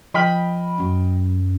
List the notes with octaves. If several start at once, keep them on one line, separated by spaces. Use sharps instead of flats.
F3 D#5 G5 B5 F6
F#2 F#3